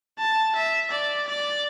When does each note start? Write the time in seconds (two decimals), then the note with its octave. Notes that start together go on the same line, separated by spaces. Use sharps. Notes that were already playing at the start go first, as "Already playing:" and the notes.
0.19 A5
0.56 E5
0.91 D5
1.28 D5